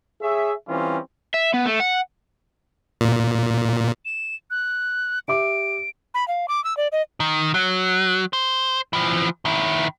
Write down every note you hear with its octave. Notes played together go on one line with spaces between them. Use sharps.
G#4 C#5 E5
E3 G3 C4 C#4 F4
E5
B3
A3
F#5
A#2
E7
F#6
G4 E5 D6 D7
B5
F5
D6
E6
D5
D#5
D#3
F#3
C5
E3 F3
D#3 E4